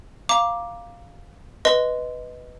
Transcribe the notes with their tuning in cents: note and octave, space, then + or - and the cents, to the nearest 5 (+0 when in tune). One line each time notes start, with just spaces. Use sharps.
F5 +0 A#5 +15 D6 +0
B4 +0 D#5 +5 C6 -15